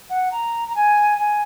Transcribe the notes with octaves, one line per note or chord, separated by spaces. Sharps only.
F#5
A#5
A#5
G#5
G#5